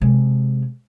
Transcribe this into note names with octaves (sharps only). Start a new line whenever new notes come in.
C3 G#3